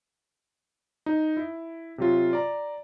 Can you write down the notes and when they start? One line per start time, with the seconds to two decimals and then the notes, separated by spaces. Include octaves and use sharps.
1.06 D#4
1.37 E4
1.98 C3 F#3 F4
2.33 D5 A#5